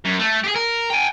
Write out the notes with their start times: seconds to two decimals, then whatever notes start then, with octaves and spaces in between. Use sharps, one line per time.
0.05 F#2
0.19 A3
0.44 G4 G#4
0.56 A#4
0.90 G5 G#5